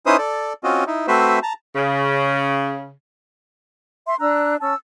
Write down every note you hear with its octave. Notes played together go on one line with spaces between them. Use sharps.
C#4 D#4 E4 B4 C5 D#6
A4 D5
C4 C#4 F4 F#4 D#5
D#4 E4
A3 C4 F#4 B4 C5 E5
A5 A#5
C#3
E5 C6
D4 A#5 E6 F#6
C#4 A5 E6